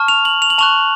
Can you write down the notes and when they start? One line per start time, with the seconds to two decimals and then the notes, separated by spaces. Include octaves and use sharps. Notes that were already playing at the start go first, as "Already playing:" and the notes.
Already playing: A5 C#6 F6
0.08 F7
0.25 F#7
0.42 F7
0.50 F#7
0.58 A5 C#6 F#6 F7